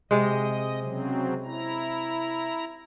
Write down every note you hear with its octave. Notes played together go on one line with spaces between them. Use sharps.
C3 G#3 D#5
C#3 F#3 C4
E4 A#5